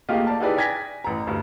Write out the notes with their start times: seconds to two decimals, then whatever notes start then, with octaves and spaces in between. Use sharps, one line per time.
0.09 A3 A#3 F4 G4 G#4 D#5
0.27 D5 A5
0.40 D#4 E4 G4 G#4 B4 D5
0.56 D5 G5 G#5 G#6 A#6 B6
1.04 A1 A#5
1.27 D2 G2